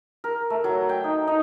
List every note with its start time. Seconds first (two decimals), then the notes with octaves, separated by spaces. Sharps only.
0.24 A#4
0.50 A3
0.64 F#3
0.89 G5
1.04 D#4
1.27 D#4